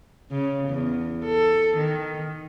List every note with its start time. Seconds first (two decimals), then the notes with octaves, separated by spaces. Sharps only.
0.31 C#3
0.69 E2
1.24 A4
1.77 D#3